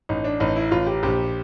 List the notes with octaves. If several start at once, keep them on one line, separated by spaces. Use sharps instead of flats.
A1 D#4
D4
A1 D#4
E4
A1 F4
G4
A#1 G4